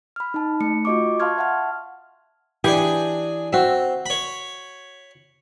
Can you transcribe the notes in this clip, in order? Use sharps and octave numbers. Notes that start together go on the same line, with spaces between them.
B5 F6
D#4 A5
A3 C#7
F4 F#4 D#5 C#6 D6
F5 A5 C6 C#6 F6 G#6
E5 F#5 A5 F6
E3 D4 G4 G#4
C4 F#4 E5
C#5 B5